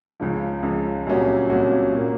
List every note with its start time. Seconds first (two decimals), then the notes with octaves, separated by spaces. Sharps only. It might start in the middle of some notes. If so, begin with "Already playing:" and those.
0.20 C#2 C#3 F3
0.63 C#2 C#3 F3
1.07 C2 A#2 F#3 C#4 F#4
1.50 C2 A#2 F#3 C#4 F#4
1.93 A#2 F#3 A#3